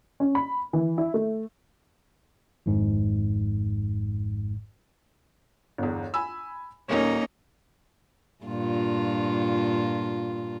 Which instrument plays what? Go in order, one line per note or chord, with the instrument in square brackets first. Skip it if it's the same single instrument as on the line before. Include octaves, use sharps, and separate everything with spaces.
[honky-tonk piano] C#4
B5
E3
E4
A3
[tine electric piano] G#1 F2 G#2
[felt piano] G1 E2
G#5 B5 E6
[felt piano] D#1 A#2 C#5 [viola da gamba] A#3 C#4 D#4
[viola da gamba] G2 A#2 F4